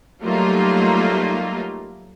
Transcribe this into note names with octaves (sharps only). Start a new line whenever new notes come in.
F#3 G3 A3 A#3 D#4 F4